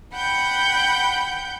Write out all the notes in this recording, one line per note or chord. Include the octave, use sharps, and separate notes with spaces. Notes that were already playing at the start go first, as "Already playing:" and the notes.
F#5 G5 B5 G6